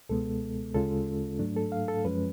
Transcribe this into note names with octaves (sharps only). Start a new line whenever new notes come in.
C#2 B2 G#3 B3 A4
D2 C#3 G#3 C#4 F4 A4
G#2 F#3 A3 D4
A4
F5
A4
F#2 F3 G#3 C#4 B4